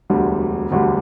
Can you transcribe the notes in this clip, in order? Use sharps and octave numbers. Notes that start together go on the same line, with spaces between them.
E1 D2 D3 G3
E1 D2 D3 G3